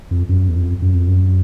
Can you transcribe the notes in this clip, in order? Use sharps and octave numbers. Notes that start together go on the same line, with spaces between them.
F2
F#2
E2
F2
F#2
F2
F#2